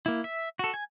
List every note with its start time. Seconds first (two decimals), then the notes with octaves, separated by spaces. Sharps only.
0.06 A#3 E4
0.24 E5
0.59 F#4 A4
0.74 G#5